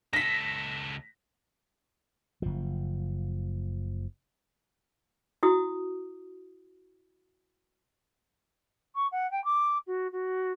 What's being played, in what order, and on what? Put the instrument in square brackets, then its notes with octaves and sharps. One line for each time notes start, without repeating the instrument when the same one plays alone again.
[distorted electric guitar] C#2 A4 [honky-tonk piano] A#6 B6
[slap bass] F#1 F3
[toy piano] E4 F#4 D#6
[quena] C#6
F#5
G5
D6
F#4
F#4